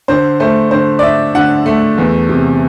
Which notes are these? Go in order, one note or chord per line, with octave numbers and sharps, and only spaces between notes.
D3 C5
A3 C5
D3 C5
D5
D4 E5
D3 F#5
A3
E2
C3